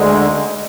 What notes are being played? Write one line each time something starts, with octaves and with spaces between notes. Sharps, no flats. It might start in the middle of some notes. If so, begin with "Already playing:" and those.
Already playing: D2 D3 G#3